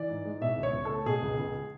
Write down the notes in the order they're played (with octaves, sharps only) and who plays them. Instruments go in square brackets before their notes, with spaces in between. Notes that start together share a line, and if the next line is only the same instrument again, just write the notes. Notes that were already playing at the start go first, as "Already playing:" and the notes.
Already playing: [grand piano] E3 D5
G#2
G#3
B2 E5
C#2
C#5
C#2
A3 A4
B2 G#4
C#2
C#2